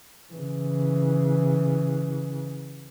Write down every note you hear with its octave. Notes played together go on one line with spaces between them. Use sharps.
C#3 E3